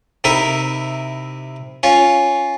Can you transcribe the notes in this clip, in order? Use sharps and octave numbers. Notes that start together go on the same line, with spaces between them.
C3 D#4 E4 A#4
C#4 F4